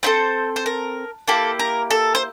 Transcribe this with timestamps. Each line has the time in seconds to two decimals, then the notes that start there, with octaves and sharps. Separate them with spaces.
0.03 C4 E4 A4 C5
0.56 C5
0.66 A#4
1.28 A#3 E4 G4 A4
1.59 A#4
1.91 A4
2.15 C5